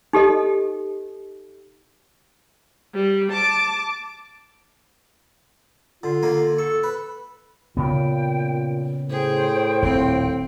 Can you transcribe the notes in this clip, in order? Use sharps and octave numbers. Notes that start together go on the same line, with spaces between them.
D#4 G4 A4 D#5
G3
A5 D6
D3 F4
D3 A#3 G#5
A4 C#6
B4
A#2 C#3 B3 G5
A2 G#4 C5 G5
D#1 C4